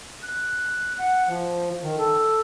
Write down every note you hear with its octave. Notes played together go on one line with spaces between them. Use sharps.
F#6
F#5
F3
D#3
A4